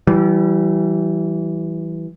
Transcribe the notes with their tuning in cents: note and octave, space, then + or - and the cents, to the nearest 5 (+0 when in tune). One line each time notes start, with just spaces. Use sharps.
E3 +0 G3 -35